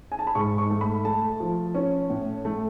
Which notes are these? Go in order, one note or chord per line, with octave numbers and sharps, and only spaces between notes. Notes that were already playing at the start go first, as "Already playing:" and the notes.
G#5
A5
B5
G#2 C#6
C#6
A3
B5
A3 A5
F3
C#4
A2
A3